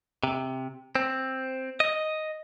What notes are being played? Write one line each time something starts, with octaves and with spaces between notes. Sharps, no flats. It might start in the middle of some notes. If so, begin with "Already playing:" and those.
C3
C4
D#5